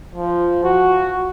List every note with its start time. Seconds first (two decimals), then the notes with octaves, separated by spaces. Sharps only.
0.15 F3
0.64 F#4